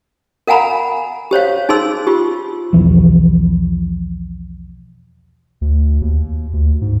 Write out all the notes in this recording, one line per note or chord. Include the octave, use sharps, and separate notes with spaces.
A#4 F5 F#5 G#5 A#5 B5
G4 C5 C#5 F5
D#4 G#4 C5 C6 E6
F4 G4
B1 E2 E3 F3
D2
D#2
D2
G#2